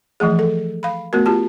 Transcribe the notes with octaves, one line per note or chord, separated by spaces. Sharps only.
E3 F3 A3 G#4
A4
F5 B5
A3 B3 F#4 A#4
F4 G4 A5